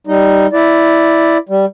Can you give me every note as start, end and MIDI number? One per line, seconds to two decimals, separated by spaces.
0.07 0.47 55
0.07 0.47 63
0.53 1.38 64
0.53 1.38 74
1.49 1.65 55